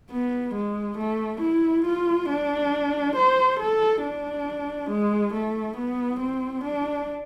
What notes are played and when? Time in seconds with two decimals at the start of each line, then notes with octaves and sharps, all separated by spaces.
0.11 B3
0.55 G#3
0.98 A3
1.41 E4
1.85 F4
2.29 D4
3.16 C5
3.60 A4
4.03 D4
4.90 G#3
5.34 A3
5.77 B3
6.20 C4
6.64 D4